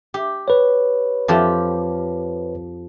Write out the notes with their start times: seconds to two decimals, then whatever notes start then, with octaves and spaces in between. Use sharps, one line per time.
0.14 G4
0.48 B4 C#5
1.28 F2 F3 G4